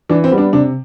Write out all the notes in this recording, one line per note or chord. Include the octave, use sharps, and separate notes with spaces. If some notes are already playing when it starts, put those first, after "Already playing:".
E3 D4
C4
G3 B3
D4
C3 D4